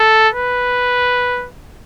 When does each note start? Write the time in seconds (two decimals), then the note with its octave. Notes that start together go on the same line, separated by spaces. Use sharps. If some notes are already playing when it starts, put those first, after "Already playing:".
Already playing: A4
0.34 B4